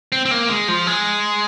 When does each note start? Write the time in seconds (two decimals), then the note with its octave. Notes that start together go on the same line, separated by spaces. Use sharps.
0.12 C4
0.25 C4
0.31 A#3
0.49 G#3
0.68 F3
0.87 G#3